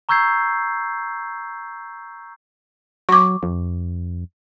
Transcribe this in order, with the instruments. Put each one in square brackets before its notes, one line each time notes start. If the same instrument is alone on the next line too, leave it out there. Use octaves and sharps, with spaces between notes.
[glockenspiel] A#5 C#6 E6 G6 G#6 C7
[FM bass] F#3 [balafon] C#6 D6
[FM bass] F2